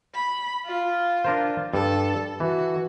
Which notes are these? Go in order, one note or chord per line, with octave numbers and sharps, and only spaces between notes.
B5
F4
D4 A#4 C5
G2 A4
E3 F#4